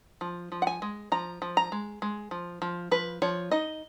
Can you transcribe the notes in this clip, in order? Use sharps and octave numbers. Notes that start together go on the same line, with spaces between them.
F3
F3
F#5
G#5
G#3
F3 A#5
F3
A#5
G#3
G#3
F3
F3
F3 B4
F3 C#5
D#4 D#5